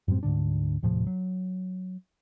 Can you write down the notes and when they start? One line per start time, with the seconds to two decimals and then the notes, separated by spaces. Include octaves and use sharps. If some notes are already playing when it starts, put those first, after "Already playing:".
0.08 F#2 A2 G3 C4
0.23 D2 G#2 D3 D4
0.83 D#1 A2 C3 F3
1.07 F#3